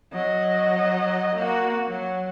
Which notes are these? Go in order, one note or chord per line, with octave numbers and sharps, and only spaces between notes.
F#3 D#5
A#3 F#4
F#3